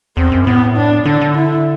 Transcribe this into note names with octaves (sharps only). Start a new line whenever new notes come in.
E2 C4
F#2
A2 B3
D4
D3 D4
D3
E4